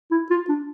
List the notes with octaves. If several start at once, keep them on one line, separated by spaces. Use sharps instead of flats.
E4
F4
D4